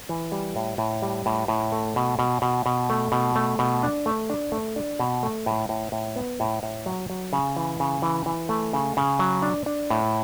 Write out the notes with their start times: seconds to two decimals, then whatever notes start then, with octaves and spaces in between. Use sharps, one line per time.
0.09 E3
0.32 G3
0.56 A2
0.78 A2
1.02 G3
1.26 A2
1.48 A2
1.72 A3
1.96 B2
2.19 B2
2.42 B2
2.66 B2
2.90 A3
3.12 B2
3.36 A3
3.59 B2
3.83 D4
4.06 A3
4.30 D4
4.52 A3
4.76 D4
4.99 B2
5.23 A3
5.46 A2
5.69 A2
5.92 A2
6.16 B3
6.40 A2
6.63 A2
6.86 F#3
7.10 F#3
7.33 C#3
7.56 E3
7.80 C#3
8.02 E3
8.26 E3
8.49 A3
8.73 C#3
8.97 C#3
9.19 F#3
9.43 D4
9.66 D4
9.90 A2